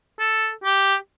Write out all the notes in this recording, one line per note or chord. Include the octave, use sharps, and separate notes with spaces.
A4
G4